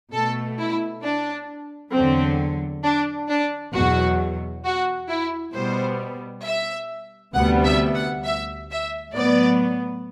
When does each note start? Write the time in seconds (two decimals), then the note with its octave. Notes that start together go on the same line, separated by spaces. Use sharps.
0.12 B2 A3 A4
0.59 E4
1.03 D4
1.93 E2 D3 F#3 C4
2.83 D4
3.29 D4
3.74 E2 B2 F#3 F#4
4.64 F#4
5.09 E4
5.54 B2 G3 B3 C5
6.45 E5
7.35 D2 C3 G3 B3 F#5
7.65 E5
7.94 F#5
8.25 E5
8.70 E5
9.14 A2 F#3 B3 D5